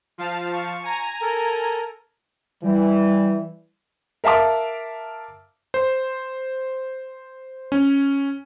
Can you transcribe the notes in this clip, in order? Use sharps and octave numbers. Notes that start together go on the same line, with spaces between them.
F3 F5 A5
C#6
G#5 A#5
A4 A#4
E3 G3
A#4 E5 F5 A5 D6
C5
C#4